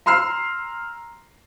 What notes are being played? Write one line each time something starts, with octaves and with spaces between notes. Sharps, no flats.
A#5 C6 E6 F6 C7